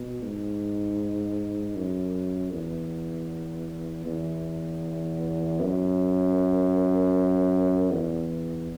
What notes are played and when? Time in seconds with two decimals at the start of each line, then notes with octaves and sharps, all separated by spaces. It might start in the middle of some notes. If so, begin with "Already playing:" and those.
Already playing: B2
0.22 G#2
1.76 F#2
2.53 E2
4.06 E2
5.61 F#2
7.91 E2